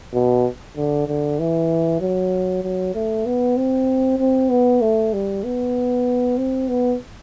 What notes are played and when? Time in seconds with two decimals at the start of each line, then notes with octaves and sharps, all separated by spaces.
0.13 B2
0.77 D3
1.08 D3
1.39 E3
2.00 F#3
2.63 F#3
2.94 A3
3.25 B3
3.57 C4
4.19 C4
4.50 B3
4.81 A3
5.13 G3
5.44 B3
6.38 C4
6.68 B3